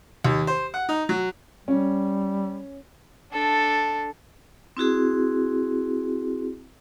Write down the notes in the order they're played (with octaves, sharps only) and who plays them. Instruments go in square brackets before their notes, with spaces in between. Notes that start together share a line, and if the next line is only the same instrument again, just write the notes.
[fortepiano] D#2
C5
F#5
D#4
F#3
[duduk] G3 [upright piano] C#4
[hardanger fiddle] D4 A4
[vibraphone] C4 E4 F#4 G#4